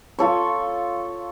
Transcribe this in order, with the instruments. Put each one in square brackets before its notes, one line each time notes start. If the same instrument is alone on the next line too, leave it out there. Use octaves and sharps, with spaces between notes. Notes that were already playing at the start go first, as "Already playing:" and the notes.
[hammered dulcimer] F4 A4 C#5